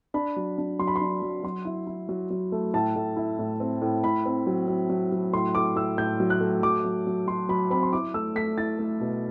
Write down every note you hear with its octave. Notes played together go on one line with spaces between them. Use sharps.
D4 B5
F#3
D4
F#3 C6
B5
C6
D4
F#3
F#3 C6
E4
E4
F#3
F#3
A3
A2 A5
A2
E4
A2
C4
A2
A2 B5
C4
F#3
F#3
F#3
F#3
A2 C6
A2 D6
A2 E6
A2 G6
F#3
F#6
A3
F#3 D6
F#3
F#3
F#3 C6
F#3 B5
C4 B5
C6
E4 D6
A3 E6
A3 B6
E4 A6
A3
B2